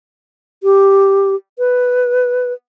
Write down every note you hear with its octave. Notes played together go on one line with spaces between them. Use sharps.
G4
B4